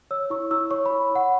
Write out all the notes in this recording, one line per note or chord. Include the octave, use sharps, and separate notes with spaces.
C#5 E6
E4 C#6
E4 E6
C#5 C#6
E4 B5
E4 F#5